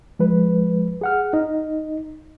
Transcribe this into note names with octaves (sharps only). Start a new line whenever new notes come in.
F3 G#3 B4
G#4 F#5 F6
D#4 D#5